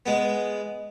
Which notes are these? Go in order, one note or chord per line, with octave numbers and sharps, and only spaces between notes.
G#3 B3